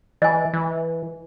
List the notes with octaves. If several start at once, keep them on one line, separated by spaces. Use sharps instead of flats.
E3 D#5 G#5
E3